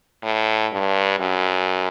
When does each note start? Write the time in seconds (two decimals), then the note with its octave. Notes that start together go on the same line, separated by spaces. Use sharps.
0.23 A2
0.72 G2
1.20 F#2